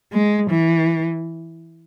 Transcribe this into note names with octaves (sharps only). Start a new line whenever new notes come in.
G#3
E3